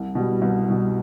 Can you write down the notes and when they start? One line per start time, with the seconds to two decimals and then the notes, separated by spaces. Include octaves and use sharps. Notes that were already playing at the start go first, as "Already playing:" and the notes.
Already playing: C2
0.15 B2 G3
0.42 C2
0.67 B2 G3